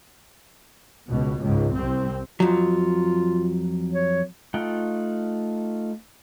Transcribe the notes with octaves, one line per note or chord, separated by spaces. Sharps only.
C#2 B2
C#2 G#2
C2 C4
F2 F#3 F4
C#5
A3 D#4 F4 F#5 G5